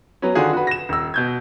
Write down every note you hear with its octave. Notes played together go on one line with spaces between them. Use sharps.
F#3 B3 C#4
D3 D#3 F4 F#4 G#4
F#4 B4
A#6 E7
D#1 E6
B2 G6 G#6